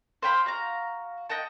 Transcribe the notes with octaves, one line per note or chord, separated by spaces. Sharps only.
C5 F5 G5 B5
F#4 F5 A#5
D#5 F#5 G5 A5